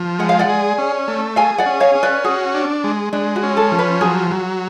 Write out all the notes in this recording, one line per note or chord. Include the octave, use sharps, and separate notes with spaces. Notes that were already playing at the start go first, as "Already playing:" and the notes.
Already playing: F3
G#3 F#5
F5
D5 F#5
G#4
C#4
A3
G#4 F5 G#5
D5 F#5
C#4
C#5 F5
C#4
B4 D5
F#4 G#4
D4
G#3
G#3 D4
F#4
C#4
A4
F3
B4
F#3 G#4
F#3